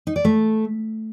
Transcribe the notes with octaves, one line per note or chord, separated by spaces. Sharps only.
D#4
D5
A3